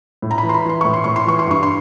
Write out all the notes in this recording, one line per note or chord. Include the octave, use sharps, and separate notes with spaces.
A2
A#5
B5
E3
C6
B5
E3 C6
A2 C#6
C6
A2 C#6
C6
E3 C#6
C6
G2 C#6
C6